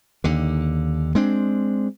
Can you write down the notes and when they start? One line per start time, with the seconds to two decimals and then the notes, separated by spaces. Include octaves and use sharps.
0.24 D#2 D3
1.15 G#3 C4 D4